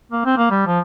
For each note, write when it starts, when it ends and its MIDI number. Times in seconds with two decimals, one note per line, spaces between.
0.12 0.23 58
0.25 0.34 60
0.37 0.47 58
0.50 0.66 55
0.66 0.80 53